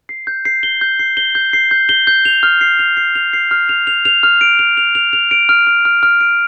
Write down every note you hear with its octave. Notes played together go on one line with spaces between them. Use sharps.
C7
G6
C7
G7
G6
C7
G7
G6
C7
G6
G7
G6
F7
F6
C7
F7
C7
F7
C7
F6
F7
F7
F7
F6
D7
F7
F7
F7
F7
D7
F6
F6
F6
F6
D7